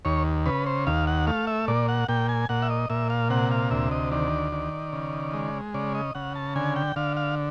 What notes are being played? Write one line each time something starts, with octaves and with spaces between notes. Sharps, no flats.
D#2 C#5
C#3 B4
C5
D#2 F5
F#5
A3 F5
E5
A#2 D5
F#5
A#2 G5
G#5
A#2 F#5
E5
D#5
A#2 E5
F5
C3 F#5
F5
D2 E5
D#5
D#3 D5
D#3
C#3
G#3
C#3 D5
D#5
C#3 F#5
A5
D3 G#5
G5
D3 F5
F5